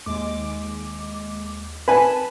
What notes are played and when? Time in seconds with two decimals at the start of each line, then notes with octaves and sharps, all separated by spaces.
0.06 D#2 G#3 D6
1.88 B4 G#5 A5 B6